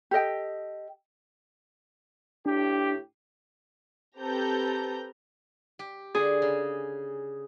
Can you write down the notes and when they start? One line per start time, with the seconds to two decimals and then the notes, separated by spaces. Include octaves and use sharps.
0.11 G4 A4 D#5 G5
2.46 A2 D4 G4
4.17 C4 G4 A4 B4 A#5 G6
5.79 G4
6.15 D3 G#4 D5
6.42 C#3